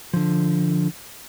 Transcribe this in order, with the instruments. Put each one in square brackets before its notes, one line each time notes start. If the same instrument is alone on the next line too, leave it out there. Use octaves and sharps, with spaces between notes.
[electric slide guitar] D3 F3